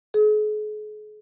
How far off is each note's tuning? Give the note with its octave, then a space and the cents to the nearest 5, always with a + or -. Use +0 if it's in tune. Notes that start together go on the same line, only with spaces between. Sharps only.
G#4 +40